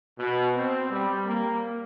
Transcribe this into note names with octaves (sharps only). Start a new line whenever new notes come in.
B2
C4
G3
A#3